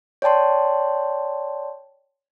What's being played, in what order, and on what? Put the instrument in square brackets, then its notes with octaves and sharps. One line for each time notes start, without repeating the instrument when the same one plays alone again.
[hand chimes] C#5 D5 G5 A5 C6